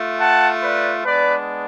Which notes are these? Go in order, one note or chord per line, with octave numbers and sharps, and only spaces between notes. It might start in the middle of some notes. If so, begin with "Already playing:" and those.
Already playing: A3 F4
F#5 A5
B4 D5
G#3 B3 D4 B4 D5